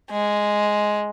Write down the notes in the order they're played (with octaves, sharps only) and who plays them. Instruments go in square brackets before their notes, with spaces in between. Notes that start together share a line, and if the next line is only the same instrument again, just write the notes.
[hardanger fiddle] G#3